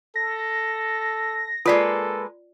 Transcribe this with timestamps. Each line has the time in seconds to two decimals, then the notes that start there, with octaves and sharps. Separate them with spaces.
0.16 A4 A#6
1.66 G#3 A#3 F4 A4 B4 D5